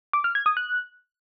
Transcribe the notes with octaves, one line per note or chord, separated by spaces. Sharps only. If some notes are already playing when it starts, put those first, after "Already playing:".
D6
F6
G#6
D#6
F#6